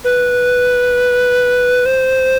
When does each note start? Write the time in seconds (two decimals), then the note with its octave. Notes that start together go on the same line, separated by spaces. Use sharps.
0.04 B4
1.86 C5